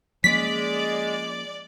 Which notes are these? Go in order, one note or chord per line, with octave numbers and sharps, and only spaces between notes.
F3 G#3 A#3 C#4 D5 B6